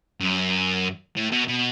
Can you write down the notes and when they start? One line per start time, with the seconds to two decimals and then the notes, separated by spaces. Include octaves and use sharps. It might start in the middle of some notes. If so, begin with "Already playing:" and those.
0.20 F#2
1.16 A2
1.32 B2
1.48 B2